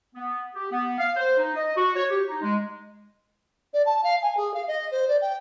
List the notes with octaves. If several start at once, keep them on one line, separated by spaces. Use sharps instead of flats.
B3
G4
B3
F5
C5
D#4
D#5
F#4
C#5
G4
D#4
G#3
D5
A5
F5
G#5
G#4
F5
D#5
C5
D5
G5